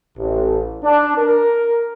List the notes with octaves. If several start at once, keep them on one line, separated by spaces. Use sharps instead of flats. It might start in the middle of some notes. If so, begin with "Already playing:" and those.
A1
D4
A#4